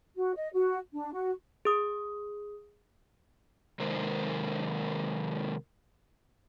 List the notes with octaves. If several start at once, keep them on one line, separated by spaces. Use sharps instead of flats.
F#4
D#5
F#4
D4
F#4
G#4 D#6
C3 D#3 G#3 A#4 C5